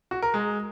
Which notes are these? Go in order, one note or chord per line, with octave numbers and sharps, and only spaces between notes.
F#4
A#4
G#3